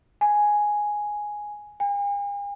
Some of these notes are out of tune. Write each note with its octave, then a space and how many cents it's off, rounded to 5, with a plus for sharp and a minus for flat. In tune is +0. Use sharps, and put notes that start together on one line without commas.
G#5 +0
G#5 -45